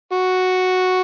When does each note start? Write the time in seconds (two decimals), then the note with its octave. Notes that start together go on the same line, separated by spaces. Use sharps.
0.12 F#4